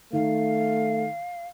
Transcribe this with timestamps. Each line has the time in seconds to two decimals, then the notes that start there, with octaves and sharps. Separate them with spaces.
0.13 D#3 A3 F5